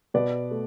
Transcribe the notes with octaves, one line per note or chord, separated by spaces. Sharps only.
B2 B4 D5
A3